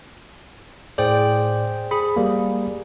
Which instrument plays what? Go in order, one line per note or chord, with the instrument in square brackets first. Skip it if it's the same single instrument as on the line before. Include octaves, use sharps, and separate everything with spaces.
[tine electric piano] A2 D5 [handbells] G#4 C5 G5
[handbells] G#4 [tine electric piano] B5 D#6
[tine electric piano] G3 A#3